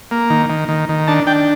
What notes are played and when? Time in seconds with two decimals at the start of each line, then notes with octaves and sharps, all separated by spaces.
0.11 A#3
0.30 D#3
0.50 D#3
0.69 D#3
0.89 D#3
1.08 D4 A5
1.27 D4 G5